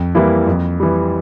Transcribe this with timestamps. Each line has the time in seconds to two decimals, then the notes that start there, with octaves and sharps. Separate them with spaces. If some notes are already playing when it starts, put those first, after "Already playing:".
Already playing: F2
0.15 E3 G3 A#3 E4
0.47 F2
0.80 E3 G3